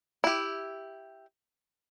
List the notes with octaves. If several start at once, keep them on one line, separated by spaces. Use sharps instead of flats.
E4 G4